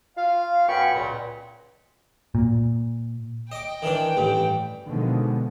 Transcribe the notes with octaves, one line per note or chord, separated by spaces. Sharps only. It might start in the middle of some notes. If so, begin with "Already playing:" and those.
F4 F5
F#2 B3 G5 G#5 B5 C#6
C#2 A#2
A#2
D#5 G5 D6
D#3 E3 D4
A1 G2
B2 D3 D#3 F3 G#3 B3